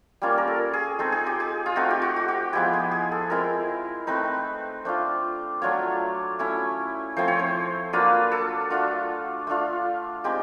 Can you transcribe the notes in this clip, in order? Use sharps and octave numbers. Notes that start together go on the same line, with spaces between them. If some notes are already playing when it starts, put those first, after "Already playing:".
G3 A#3 C#4 F4
A#4
A4
G#4
G#3 C4 D#4 A4
G#4
G4
G#4
F4
A3 C4 D#4 F#4
G4
F#4
F#4
G4
F3 G#3 B3 E4 G4
G#4
G#4
A4
G#3 C4 E4 A#4
A3 C4 D#4 B4
A3 D4 F4 C5
F#3 A3 D4 F4 C#5
A3 C#4 E4
F3 A3 C4 E4 C5
C#5
C5
F#3 A#3 D4 F4 B4
A4
A3 D4 F4 F#4
A3 D4 F4
G#3 C4 D#4 G4